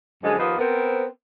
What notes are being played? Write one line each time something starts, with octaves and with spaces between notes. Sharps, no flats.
F#2 D3 F3 G#3
D#2 F3 A#3 B3 B4 D#5
B3 C4 A#4